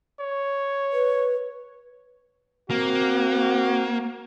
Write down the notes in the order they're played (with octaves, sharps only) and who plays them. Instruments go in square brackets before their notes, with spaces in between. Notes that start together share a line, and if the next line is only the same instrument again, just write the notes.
[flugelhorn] C#5
[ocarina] B4
[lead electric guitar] A#3 [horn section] C4 F#4